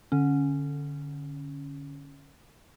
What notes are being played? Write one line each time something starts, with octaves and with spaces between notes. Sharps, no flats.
D3 C#4